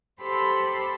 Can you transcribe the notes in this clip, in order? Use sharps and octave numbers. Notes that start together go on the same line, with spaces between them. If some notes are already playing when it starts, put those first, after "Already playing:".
G4 A4 C5 B5 C6 E6